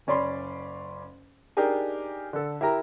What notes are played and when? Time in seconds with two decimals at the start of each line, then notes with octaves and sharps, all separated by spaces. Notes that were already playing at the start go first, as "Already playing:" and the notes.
0.07 F#1 C#4 D5 B5 C6
1.57 D4 D#4 G4 G#4 A#4 G#5
2.33 D3 A4
2.61 E4 G4 A#4 A#5